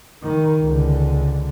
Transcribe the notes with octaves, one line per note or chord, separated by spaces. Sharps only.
D#3
C#2 D3